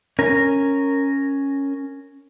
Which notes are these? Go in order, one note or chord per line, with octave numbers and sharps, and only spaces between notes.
C#4 A#4